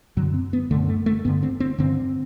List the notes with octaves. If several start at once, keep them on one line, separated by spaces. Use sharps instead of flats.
F#2 D3 F#3
C4
B3
F#2 D3 A3
A3
A3
G2 D3 B3
C4
C4
G2 D3 C4